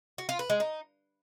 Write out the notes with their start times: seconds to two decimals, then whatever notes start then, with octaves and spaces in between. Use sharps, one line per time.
0.18 F#4
0.29 F4
0.39 B4
0.50 G#3
0.60 D#4